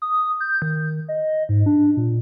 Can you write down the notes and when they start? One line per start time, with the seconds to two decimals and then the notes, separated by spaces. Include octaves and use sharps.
0.02 D#6
0.40 G6
0.62 D#3
1.09 D#5
1.49 G#2
1.66 D4
1.97 A#2